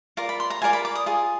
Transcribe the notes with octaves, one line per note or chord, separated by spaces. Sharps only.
F4 A#4 D5 A#5
B5
C6
A#5
F4 A#4 D5 G#5
B5
D6
D#6
F4 G#4